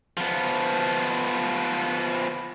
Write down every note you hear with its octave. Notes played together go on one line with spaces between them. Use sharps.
F3 B3